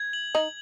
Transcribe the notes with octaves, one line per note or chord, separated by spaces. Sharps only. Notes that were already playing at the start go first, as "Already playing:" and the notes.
Already playing: G#6
F#7
D#4 F#7